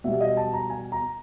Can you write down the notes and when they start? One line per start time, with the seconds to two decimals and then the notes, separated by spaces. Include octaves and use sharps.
0.04 B2 G3 E5
0.21 D#5
0.37 A5
0.53 A#5
0.70 G#5
0.92 A#5